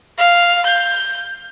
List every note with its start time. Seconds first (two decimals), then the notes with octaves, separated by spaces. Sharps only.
0.18 F5
0.66 G6